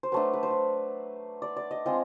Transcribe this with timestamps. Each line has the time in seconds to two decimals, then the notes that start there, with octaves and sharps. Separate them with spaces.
0.03 C5
0.12 F#3 A3 D4 B4
0.33 B4
0.43 C5
0.50 B4
1.42 D5
1.56 D5
1.71 D#5
1.86 G#3 C4 F4 D#5